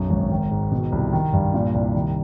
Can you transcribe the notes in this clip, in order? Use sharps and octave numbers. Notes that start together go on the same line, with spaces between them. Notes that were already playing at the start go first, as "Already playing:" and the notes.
Already playing: B1 F#2
G#1
D#3
G#2
B2
C2
D#3
G2
A#2
C2
D#3